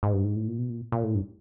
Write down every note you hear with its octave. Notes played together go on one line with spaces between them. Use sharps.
G#2
G2
G#2
A2
A#2
B2
A#2
A#2
A2
G2